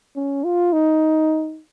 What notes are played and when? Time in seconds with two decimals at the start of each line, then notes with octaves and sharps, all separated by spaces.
0.16 C#4
0.44 F4
0.73 D#4